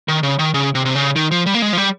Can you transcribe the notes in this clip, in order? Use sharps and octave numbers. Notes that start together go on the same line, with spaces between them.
D#3
C#3
D#3
C#3
C3
C3
C#3
D#3
F3
G3
A#3
G#3
F3
G3